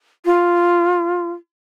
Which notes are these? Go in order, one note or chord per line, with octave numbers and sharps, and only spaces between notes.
F4